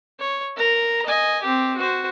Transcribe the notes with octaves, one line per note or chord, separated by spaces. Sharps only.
C#5
A#4 A#5
D#5 G#5
C4 G4
F#4 C5